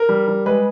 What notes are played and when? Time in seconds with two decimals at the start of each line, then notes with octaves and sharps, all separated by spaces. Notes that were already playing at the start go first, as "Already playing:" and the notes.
Already playing: A#4
0.09 G3
0.28 G3
0.46 G#3 B4